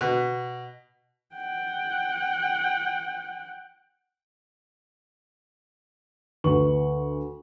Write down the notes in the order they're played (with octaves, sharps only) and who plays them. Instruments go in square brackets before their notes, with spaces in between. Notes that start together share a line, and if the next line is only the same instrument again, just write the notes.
[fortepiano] B2
[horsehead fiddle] F#5 G5
[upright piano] D2 B4 C#6 F#7